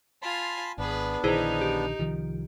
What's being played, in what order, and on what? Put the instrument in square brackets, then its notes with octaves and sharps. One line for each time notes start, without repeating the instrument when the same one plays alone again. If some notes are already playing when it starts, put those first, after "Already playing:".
[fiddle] F4 G#5 [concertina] A5 B5 C6
[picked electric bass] G#1 [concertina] B3 D4 [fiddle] G#4 B4
[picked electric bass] A#1 D3 D#3 [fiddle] D#4 [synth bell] E4 G#4 C5
[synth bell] G4
[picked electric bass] C2 D#3 F3